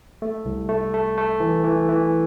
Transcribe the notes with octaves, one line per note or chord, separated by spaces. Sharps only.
A3
C2
A3
A3
A3
E3
E3
E3